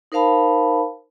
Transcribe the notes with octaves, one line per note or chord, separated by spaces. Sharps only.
D#4 A#4 C5 F5 A5 B5